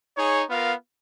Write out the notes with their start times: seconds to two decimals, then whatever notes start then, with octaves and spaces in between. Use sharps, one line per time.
0.17 D#4 G#4 C#5
0.49 B3 F4 A#4 F5